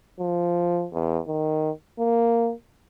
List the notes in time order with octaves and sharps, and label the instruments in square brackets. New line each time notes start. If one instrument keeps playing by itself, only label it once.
[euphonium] F3
E2
D#3
A#3